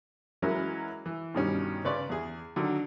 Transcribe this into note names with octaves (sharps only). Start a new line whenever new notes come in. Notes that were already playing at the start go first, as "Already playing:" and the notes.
E3 F#3 G#3 C#4 E4 A#4
E3
G2 B2 D#3 G3 C#4
C#3 B4 C#5 D5 C6
E2 G#4
D3 D#3 F#3